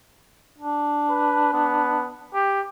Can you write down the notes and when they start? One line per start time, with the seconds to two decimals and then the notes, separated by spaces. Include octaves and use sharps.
0.58 D4
1.10 B4
1.53 B3
2.34 G4